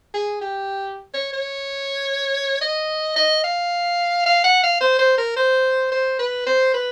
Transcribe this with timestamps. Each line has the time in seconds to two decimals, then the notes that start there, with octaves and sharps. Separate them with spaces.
0.14 G#4
0.41 G4
1.14 C#5
1.33 C#5
2.61 D#5
3.16 D#5
3.44 F5
4.26 F5
4.44 F#5
4.63 F5
4.81 C5
4.99 C5
5.18 A#4
5.36 C5
5.92 C5
6.19 B4
6.46 C5
6.74 B4